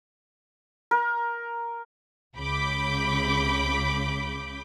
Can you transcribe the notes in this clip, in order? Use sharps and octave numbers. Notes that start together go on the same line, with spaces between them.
A#4
C#2 C#3 B5 D6 G6